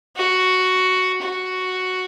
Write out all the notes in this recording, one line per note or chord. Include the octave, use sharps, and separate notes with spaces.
F#4
F#4